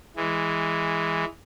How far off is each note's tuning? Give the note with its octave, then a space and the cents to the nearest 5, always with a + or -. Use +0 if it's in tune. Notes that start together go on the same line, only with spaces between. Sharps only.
E3 +0 G#3 -5